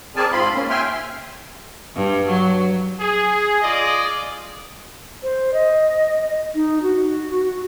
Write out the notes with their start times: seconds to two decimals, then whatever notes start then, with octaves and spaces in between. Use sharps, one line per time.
0.16 C4 G#4 A#4 D5 G#5 A5
0.32 G#2 C4 F4 B5 C6
0.54 A#3 C#4
0.70 E5 G5 G#5 C6 F6
1.95 G2
2.28 F#3
2.99 G#4
3.62 F4 G#4 D5 D#5
5.23 C5
5.54 D#5
6.55 D#4
6.82 F#4